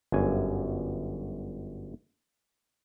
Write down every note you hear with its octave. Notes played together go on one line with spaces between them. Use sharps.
G1 F#2 G#5